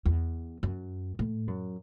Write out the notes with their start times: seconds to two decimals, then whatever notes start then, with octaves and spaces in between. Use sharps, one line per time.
0.06 E2
0.63 F#2
1.19 A2
1.48 F#2